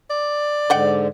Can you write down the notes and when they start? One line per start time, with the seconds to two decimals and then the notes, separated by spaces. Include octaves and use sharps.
0.10 D5
0.70 G#2 D3 D#5 F#5 G5